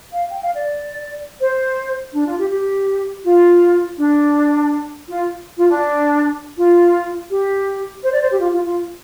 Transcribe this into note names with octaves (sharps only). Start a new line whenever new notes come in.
F5
G5
F5
D5
C5
D4
F4
G4
G4
F4
D4
F4
F4
D4
F4
G4
C5
D5
C5
G4
F4
F4
F4